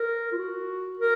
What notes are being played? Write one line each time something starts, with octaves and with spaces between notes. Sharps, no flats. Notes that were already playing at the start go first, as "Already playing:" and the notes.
Already playing: A#4
F4
F#4
A#4